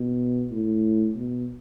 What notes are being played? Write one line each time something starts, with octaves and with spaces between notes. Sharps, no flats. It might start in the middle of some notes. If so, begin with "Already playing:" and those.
Already playing: B2
A2
B2